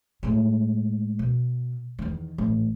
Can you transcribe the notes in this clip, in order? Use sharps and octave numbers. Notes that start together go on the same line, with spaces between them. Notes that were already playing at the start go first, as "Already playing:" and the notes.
A2 G#3
B2
E2 D#3
A1